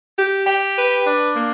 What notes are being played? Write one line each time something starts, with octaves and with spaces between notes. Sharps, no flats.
G4
G4
B4
D4
A#3